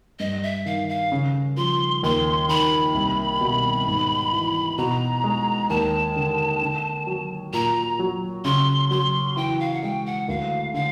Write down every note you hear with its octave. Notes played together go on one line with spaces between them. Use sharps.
G2 D#5
E5
D#3 F5
F5
C#3
F3 C6
D#2 C6
D#3 B5
C2
B2
G#2
E3
B2 A#5
G#3
D#2 A5
D3
D3
F#3
A#2 A#5
F#3
C#3 C6
F#3 C6
E3 G5
F5
F#5
G#3 G5
F#5
D2 F5
D3 F5